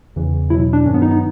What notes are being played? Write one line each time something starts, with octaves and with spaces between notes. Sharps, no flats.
E2 C#3 E3
E2 B2 F#3 E4
D4
G2 D#3 F#3 C#4
B3
D#4
B3